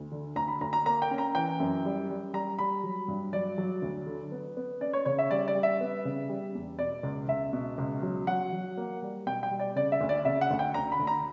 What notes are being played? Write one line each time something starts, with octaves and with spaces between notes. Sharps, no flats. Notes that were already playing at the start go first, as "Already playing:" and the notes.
Already playing: D2
D3
D2 A#5
B5
D2 A#5
A#5
A#3 A#5
G5
C#4
A#5
E3 G5
F#2
G3
G3
G3 A#5
G3 B5
F#3
G2
F#3 D5
F#3
D2
D3
B3
B3
C#4 D5
C#5
C#3 C#5
E5
G3 D5
D5
G3
E5
B3
C#3
G3
E2
B2 D5
C#2
C#2 E5
B2
C#2
F#3
F#3 F#5
F#3
A#3
G3
B2 G5
G5
G3
D5
C#3 D5
E5
D2
D5
C#3 E5
F#5
D2
G5
D2 A#5
B5
D2
A#5